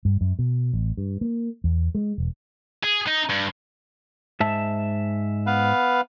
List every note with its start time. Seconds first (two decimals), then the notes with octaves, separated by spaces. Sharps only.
0.05 G2
0.21 F#2
0.39 B2
0.73 A1
0.97 G2
1.21 A#3
1.64 E2
1.95 G#3
2.18 E1
2.84 G#4
3.08 D#4
3.30 G2
4.40 G#2 E5 A5
5.46 B3 B4 F5